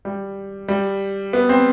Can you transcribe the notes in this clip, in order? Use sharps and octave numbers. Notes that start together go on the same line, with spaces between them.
G3
G3
B3
C4